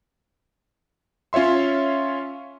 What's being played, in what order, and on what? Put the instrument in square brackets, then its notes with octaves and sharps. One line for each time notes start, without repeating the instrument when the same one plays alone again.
[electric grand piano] C#4 F4 C#5 E5 C6